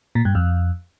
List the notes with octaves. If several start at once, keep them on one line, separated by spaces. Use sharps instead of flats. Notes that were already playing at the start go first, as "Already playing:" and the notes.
A#2
G2
F2